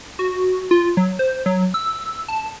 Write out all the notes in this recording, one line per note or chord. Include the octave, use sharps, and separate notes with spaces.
F#4
F4
F#3
C5
F#3
E6
A5